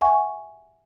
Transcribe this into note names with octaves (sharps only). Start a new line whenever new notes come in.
E5 F#5 G#5 C#6